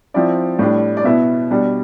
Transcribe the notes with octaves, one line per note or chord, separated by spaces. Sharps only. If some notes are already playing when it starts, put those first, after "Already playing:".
F3 C4 E4 D5
A2 G3 D4
D5
B2 B3 E4 E5
B2 G3 D4